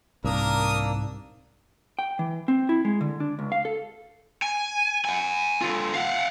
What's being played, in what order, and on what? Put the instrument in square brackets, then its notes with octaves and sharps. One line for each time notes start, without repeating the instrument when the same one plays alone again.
[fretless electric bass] C2 [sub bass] G#2 [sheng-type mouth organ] A#3 D4 E6 [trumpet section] A#4 D#6
[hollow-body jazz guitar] G5
E3
C4
E4
G#3
D3
D4
C#2
F5
A4
[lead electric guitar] G#5
F#5 G#5
D3 F4
F5 F#5